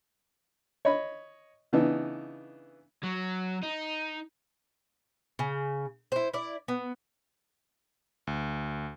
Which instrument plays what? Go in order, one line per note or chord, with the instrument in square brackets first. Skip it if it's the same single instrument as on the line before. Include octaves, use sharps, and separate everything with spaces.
[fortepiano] C#5 D#5 B5
C#3 E3 B3 D4 D#4
[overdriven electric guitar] F#3
D#4
[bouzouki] C#3
E4 C5
E4 D5
B3
[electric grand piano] D2